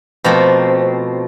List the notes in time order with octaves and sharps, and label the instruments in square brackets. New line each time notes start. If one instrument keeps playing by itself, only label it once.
[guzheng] B2 F3 A3 A#3 C4